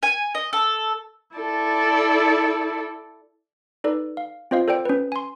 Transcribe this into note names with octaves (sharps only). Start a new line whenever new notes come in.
G#5
D#5
A4
E4 A4 D5
D#4 A4 B4 D5
F5
C4 F4 C5 D#5 F5
A4 C5 D5 G5 D7
C#4 B4
G#5 C6